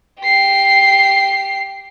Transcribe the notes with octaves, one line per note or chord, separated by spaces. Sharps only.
G4 C7